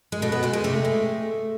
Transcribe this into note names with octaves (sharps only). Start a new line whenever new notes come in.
G#3
B2 A3
B3
G#3 A3
G#3
C3 A3
G#3